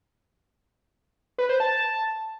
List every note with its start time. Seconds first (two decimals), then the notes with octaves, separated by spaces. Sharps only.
1.38 B4
1.49 C5
1.60 A5